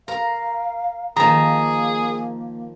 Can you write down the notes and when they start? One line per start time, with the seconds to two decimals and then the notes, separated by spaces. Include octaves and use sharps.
0.08 A#4 F5 A#5
1.17 D#3 F3 A#3 G#4 A#5